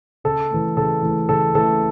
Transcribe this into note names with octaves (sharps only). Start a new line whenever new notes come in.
C#3 A4
E3 A3
C#3 A4
E3 A3
C#3 A4
E3 A3 A4